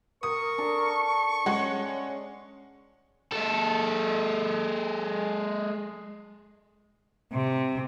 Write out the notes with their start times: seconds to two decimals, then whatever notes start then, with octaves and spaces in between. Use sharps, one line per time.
0.23 A#4 C#6 D#6
0.58 D4 A4
1.46 G#3 C#4 F#5
3.32 G#3 A4
7.33 C3